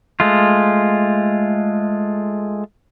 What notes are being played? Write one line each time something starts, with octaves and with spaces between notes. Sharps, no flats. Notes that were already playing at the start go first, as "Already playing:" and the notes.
G#3 A3 F4